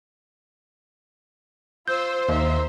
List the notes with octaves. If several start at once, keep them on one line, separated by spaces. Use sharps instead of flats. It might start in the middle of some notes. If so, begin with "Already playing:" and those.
F4 C5 E6 G6
D#2 D#4 E5